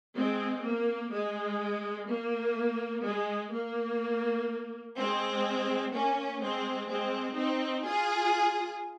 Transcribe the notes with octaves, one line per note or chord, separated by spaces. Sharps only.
G#3 C4
A#3
G#3
A#3
G#3
A#3
G#3 C4
A#3 C#4
G#3 C4
G#3 C4
C4 D#4
F4 G#4